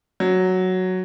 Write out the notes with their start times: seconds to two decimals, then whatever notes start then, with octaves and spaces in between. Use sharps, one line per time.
0.20 F#3